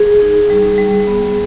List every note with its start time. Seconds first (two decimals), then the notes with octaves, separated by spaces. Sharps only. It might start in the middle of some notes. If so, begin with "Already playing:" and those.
Already playing: G#4
0.22 D#4
0.50 G3
0.78 G3
1.07 B3